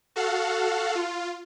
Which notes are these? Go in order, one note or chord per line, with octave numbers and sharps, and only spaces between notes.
F#4 A4 F5 F#5
F4